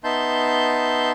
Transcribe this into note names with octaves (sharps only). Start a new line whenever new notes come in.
B3 D#4 E5 A5 C6 G6